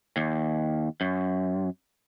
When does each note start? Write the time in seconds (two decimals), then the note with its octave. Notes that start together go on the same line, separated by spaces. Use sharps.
0.17 D#2
1.01 F#2